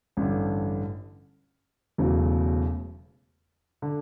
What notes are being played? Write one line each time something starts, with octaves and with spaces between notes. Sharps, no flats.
A1 G2 D3
E1 E2 C#3 F#3 A3
D3